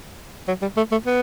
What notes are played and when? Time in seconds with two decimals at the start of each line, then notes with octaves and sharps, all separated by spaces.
0.48 F#3
0.62 G3
0.77 A3
0.92 A3
1.06 B3